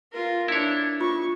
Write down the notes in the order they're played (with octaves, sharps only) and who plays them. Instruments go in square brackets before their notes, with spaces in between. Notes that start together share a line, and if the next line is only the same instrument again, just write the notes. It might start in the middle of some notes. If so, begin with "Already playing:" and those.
[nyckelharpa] F4 A#4
[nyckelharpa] D4 [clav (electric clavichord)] E4 C#5
[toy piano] F4 [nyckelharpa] C#6